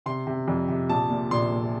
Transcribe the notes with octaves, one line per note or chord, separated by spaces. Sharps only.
C3 C6
C3
F2
C3
A#1 A5
A#2
A#1 C6
A#2